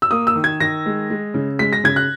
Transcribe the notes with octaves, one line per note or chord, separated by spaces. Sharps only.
E6
A#3 D#6
E6
D#3
G#6
D#3 A#6
G#3
G#3
C#3
G#3 B6
A#6
C#3 G#6
F#6